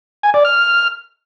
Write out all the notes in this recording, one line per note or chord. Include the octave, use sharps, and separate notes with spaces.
G#5
D5
F6